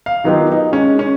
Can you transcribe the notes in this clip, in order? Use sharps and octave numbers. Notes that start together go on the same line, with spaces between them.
F5
D#3 F#3 B3 D#4 F4 G4
D#4
G#3 C#4
C#4